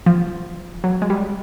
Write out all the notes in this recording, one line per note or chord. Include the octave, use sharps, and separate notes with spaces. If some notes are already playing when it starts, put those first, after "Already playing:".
F3
F#3
G#3
G3